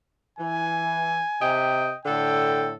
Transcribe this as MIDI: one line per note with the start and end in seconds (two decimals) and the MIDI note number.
0.39 1.20 52
0.39 1.58 80
1.41 1.92 48
1.41 1.92 75
1.41 1.92 79
2.05 2.73 45
2.05 2.73 50
2.05 2.73 69
2.05 2.71 79